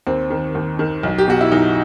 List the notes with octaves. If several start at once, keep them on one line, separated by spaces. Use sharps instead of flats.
D#2 C4
D#3
D#2
D#3
B1
G4
B2 F#4
E4
B1 D#4